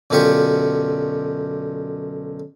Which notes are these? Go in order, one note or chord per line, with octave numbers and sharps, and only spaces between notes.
B1 F#2 D3 F4 G4 C#6